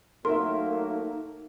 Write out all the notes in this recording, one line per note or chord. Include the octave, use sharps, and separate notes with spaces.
F#3 A3 A#3 D#4 A#4 E5 C6